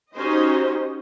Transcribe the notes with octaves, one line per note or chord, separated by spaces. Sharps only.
C#4 D#4 F#4 G4 C5 D#5